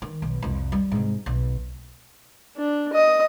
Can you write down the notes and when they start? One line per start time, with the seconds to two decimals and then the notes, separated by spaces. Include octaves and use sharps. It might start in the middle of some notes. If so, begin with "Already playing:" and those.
0.02 D#3
0.22 B1
0.42 C2 F2
0.72 G3
0.91 G#2 C3
1.26 B1
2.56 D4
2.93 D#5 D#6